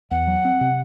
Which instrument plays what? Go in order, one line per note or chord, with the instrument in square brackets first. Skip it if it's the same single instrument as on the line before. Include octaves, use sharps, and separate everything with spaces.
[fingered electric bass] E2 [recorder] F#5
[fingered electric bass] F#3
C4
C3